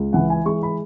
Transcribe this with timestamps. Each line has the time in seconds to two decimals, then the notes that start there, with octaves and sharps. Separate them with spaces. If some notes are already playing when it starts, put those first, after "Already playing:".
Already playing: C#2
0.13 E3 F#5
0.30 G#5
0.45 G#3 C#6
0.63 B5